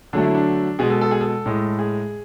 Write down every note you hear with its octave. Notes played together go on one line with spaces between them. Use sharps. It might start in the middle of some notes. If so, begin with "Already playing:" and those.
D3 F#3 A3 D4
E4
D4
B2 G#3 G#4
A4
A4
G#4
A4
A2 G#3
G#4